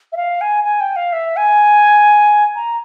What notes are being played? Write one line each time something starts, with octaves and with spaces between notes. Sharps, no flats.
E5
F5
G#5
G#5
G5
F5
E5
G#5
A#5